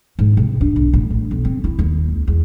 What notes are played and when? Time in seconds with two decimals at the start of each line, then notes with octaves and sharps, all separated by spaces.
0.19 G#2
0.37 C3
0.61 D4
0.76 B1
0.93 A1
1.10 A2
1.31 B1
1.45 C4
1.64 E4
1.79 D#2
2.11 C#2
2.27 E2